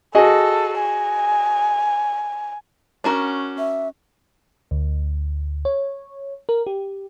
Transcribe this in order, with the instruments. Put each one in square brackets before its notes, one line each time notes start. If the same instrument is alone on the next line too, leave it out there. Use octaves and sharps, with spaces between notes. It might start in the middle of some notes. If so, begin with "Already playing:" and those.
[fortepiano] F#4 G#4 D#5 [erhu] A4
[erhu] G#5
[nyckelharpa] C#4 [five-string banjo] D4 F#4 A#4
[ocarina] E5
[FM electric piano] D2
C#5
A#4
G4